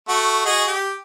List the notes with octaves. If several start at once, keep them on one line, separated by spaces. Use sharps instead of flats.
A3 F#4
F#4 G#4 D#5
G4